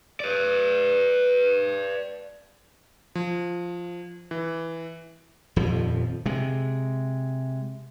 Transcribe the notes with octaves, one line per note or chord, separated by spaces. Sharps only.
B4 D5
F3
E3
D#1 F2 F3
C3 G#3